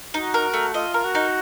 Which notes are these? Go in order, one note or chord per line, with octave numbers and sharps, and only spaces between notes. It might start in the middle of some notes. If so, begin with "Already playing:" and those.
D#4 F#4
A#4
A3
F4 D#5
A#4
F#4
D#4